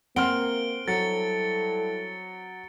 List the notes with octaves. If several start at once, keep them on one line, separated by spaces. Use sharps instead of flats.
A#3 C4 F#5 C6 F6 D7 G7
F#3 G3 E4 A4 A6 C#7